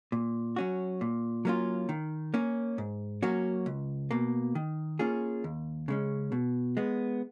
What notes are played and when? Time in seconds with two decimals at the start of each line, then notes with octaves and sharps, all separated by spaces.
0.12 A#2
0.56 F#3 C#4 F#4
1.01 A#2
1.45 F#3 A#3 C#4 F4
1.89 D#3
2.34 A#3 C#4
2.78 G#2
3.22 F#3 A#3 C#4 F#4
3.66 C#2
4.11 B2 A#3
4.55 D#3
4.99 A#3 C#4 F4 G#4
5.44 D#2
5.88 C#3 G#3 C#4
6.32 B2
6.77 G#3 B3